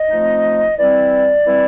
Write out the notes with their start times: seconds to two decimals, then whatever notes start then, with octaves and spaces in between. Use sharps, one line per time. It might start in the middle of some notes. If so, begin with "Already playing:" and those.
Already playing: D#5
0.08 F3 A3 C4 D#4
0.77 E3 G3 C4 E4 D5
1.46 E3 G3 C4 E4